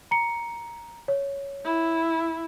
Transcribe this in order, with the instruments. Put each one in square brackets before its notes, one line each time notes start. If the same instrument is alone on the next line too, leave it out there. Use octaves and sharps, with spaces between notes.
[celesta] A#5 C#7
C#5
[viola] E4